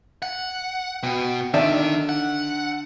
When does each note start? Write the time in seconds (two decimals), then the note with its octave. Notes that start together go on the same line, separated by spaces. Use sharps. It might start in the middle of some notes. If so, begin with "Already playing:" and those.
0.22 F#5
1.03 B2 G5
1.54 D3 D#3 D5 E5
2.09 F#5